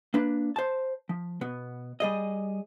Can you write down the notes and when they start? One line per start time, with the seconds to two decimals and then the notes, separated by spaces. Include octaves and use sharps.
0.14 A#3 D4 B4
0.56 C5 A5
1.09 F3
1.41 B2 B3
2.00 G3 G#4 D#5